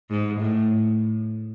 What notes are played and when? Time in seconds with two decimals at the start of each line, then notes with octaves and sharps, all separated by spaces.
0.10 G#2
0.40 A2